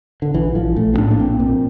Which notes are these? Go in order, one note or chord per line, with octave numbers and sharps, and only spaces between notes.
D3
A#1 E3
A#1 F3
A#1 A3
C4
A2 D4
A#3
A#1 C4
A#2